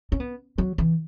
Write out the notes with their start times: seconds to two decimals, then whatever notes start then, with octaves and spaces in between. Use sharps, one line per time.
0.12 C#4
0.20 B3
0.58 F#3
0.78 E3